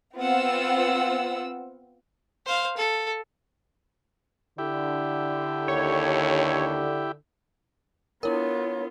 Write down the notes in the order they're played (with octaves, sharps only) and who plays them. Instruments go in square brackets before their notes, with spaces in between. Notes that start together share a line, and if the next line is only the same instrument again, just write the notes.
[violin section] B3 C4 F4 F#5 E6
[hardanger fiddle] C5 F5
A4
[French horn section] D3 [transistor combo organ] E4 G4
[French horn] D#2 [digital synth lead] C#5
[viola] B3 F4 [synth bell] D4 E4 A#4 [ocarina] C#5